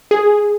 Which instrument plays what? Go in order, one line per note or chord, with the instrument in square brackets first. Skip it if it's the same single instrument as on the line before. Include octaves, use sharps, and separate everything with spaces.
[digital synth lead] G#4